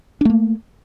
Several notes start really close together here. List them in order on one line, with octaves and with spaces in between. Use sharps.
D4 A3 A#3